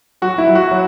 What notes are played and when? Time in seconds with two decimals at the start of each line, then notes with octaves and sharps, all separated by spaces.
0.22 F#3 F#4
0.38 E4
0.47 F#3
0.55 F#4
0.71 F#3